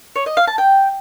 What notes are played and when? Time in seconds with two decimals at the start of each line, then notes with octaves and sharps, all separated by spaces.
0.16 C#5
0.26 D#5
0.37 F5
0.47 A5
0.58 G5